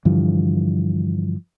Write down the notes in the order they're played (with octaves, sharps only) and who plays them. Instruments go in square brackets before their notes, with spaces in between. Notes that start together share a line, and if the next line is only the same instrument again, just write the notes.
[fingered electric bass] G2 D3 E3 F3